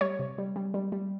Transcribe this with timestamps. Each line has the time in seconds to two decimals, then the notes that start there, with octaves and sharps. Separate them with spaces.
0.01 G3 C#5
0.19 C3
0.38 G3
0.56 G3
0.74 G3
0.92 G3